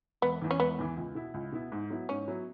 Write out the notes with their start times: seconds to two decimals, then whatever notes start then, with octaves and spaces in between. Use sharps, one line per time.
0.22 E1 B3
0.42 E2 E3
0.51 C#4
0.60 E1 B3
0.79 E2 E3
0.97 C#2
1.15 B2 B3 E4
1.34 C#2
1.52 B2 B3 E4
1.72 G#2
1.90 F#3 B3 E4
2.09 G#2 C#4
2.28 F#3 B3 E4